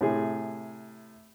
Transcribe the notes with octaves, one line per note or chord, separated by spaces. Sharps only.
A2 C3 G#4